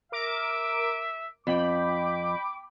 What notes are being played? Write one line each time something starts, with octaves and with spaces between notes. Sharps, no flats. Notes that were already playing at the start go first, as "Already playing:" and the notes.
A#4 E5 D6 D7
F2 G5 B5 D6